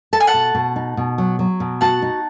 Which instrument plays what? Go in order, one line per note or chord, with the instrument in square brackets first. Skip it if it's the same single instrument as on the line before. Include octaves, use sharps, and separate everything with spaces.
[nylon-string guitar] A4 [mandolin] A5
[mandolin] G#5
F#5 A5
[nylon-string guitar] B2
B2
D#4
B2
F#3
F#3
B2
[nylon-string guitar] F#4 [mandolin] F#5 A5
[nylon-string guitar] D#4